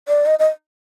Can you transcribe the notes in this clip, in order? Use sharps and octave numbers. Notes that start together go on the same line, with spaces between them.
D5
D#5
D#5